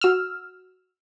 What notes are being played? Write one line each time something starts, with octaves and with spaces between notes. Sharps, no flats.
F#4 E6 F6